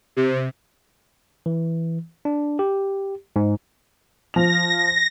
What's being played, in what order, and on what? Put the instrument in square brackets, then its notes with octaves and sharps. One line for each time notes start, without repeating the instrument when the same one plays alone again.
[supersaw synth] C3
[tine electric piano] E3
D4
G4
G#2
[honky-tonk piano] F3 F7 [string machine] A#6